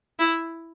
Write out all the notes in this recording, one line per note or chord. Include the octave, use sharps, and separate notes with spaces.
E4